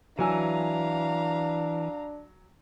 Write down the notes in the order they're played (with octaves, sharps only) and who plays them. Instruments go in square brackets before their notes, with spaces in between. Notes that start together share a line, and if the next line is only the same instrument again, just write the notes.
[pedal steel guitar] E3 [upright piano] F#3 G#5 E6 [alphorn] D4 [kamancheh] F5 A#5